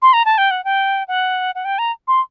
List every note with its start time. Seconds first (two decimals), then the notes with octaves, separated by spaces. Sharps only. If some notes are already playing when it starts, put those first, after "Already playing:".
0.02 C6
0.13 A#5
0.25 A5
0.38 G5
0.51 F#5
0.64 G5
1.08 F#5
1.55 F#5
1.65 G5
1.78 A#5
2.08 C6